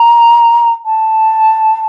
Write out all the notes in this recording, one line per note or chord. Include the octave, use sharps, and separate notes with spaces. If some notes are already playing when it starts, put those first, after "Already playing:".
Already playing: A#5
A5